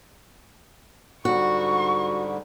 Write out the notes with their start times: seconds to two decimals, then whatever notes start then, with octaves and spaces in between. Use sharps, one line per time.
1.25 G#2 D3 G3 F#4 C#6